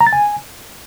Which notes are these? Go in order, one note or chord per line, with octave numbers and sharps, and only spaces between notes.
A#5
A6
G#5